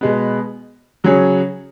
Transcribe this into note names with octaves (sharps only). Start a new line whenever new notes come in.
B2 G#3 B3
C#3 F#3 C#4 G#4 C#5